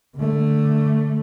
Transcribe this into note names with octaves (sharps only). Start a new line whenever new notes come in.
D3 A3